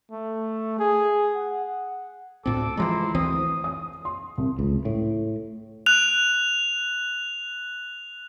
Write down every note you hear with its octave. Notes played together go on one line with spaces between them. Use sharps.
A3
G#4
F#5
D2 A2 C4 A4 D6
E3 F3 G#3 E4 A#5 C6
D2 E3 C4 D#6
D#6
C6
C2
C#2
A2
F#6 F7